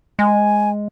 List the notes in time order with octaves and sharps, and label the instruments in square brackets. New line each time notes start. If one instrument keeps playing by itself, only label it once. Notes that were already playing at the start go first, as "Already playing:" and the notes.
[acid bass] G#3 [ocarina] G#5